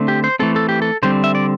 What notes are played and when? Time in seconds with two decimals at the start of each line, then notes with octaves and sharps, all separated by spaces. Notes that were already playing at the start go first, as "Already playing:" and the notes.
Already playing: D3 A3 C4
0.08 G4
0.24 C5
0.39 E3 A3 C4 A4
0.56 A4
0.69 G4
0.82 A4
1.03 D3 G3 C4 C5
1.24 E5
1.35 D5